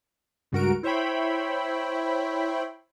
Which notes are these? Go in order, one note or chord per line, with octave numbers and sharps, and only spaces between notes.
C#2 G2 F#4 A#4 D7
E4 C5 C#5 E5 G5 B5